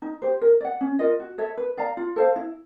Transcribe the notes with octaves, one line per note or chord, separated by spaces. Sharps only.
D#4
G4 C5
A#4
D5
F#5
C#4
F4 A#4 D#5
F#4
A4 C#5 E5
B4
D5 F5 A#5
F4
A4 C5 F5
E4